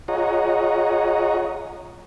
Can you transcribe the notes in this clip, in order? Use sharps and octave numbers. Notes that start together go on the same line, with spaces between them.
F4 G#4 C#5 D#5 F#5 A#5